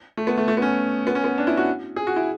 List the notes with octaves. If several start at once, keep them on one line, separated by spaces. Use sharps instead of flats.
A3
B3
A3
A3
B3
C#4
B3
C#4
B3
D4
E4
F#4
G#4
F#4
E4